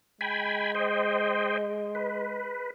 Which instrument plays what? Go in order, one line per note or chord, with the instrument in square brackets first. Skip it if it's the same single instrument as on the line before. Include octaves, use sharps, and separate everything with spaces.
[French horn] G#3 [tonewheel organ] G5 G#5 B5
[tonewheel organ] C5 D#5 G5
B4